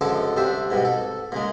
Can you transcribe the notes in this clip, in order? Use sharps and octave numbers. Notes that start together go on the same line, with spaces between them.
C#2 F#2 D3 F3 A4 A5
C2 G3 D4 C5 E5
G#2 B2 G3
A4
A#2 C#3 G#3